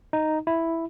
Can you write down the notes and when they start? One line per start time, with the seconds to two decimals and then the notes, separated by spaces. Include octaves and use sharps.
0.13 D#4
0.47 E4